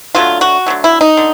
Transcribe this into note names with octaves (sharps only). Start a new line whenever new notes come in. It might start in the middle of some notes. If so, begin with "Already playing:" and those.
D3 F#3 A3 F4
F#4
D3 F#3 A3
E4
D#4
D3